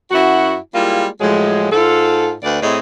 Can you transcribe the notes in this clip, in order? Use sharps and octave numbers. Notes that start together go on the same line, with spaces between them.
F#2 E4 F#4
G3 G#3 A#3 E4 F4
A2 F3 F#3 G#3
G#2 F4 A4
D2 B4 D5
A2 C4 G#4 D#5